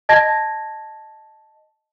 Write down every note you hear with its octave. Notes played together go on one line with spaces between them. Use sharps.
D#5 A5 G#6 A#6